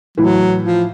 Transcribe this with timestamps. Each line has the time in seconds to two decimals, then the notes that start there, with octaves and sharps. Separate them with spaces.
0.18 A2 E3 F#3
0.63 F3